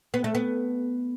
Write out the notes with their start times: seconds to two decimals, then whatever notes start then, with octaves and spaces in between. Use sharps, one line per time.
0.14 B3
0.24 A3
0.35 B3